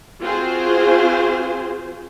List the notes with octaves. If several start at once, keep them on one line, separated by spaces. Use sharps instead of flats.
C4 F4 F#4 G#4 C5